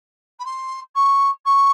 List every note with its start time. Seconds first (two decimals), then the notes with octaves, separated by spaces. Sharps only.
0.39 B5
0.45 C6
0.95 C#6
1.45 C#6